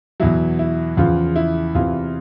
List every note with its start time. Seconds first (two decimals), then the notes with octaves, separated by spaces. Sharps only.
0.20 E2 B2 F#3 E4
0.59 E4
0.97 E2 C#3 F3 F4
1.36 E4
1.75 E2 C3 E3 F4